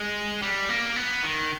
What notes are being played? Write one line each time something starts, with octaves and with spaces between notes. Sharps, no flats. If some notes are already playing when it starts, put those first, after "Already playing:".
Already playing: G#3
G3
A#3
B3
D#3